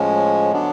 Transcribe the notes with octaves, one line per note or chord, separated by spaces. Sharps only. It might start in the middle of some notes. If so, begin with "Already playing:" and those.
Already playing: A2 F3 G#3 C#4
D3 F#3 B3 D4